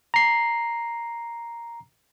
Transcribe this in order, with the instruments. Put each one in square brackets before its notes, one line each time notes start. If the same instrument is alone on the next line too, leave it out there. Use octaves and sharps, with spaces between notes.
[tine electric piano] A#5 C7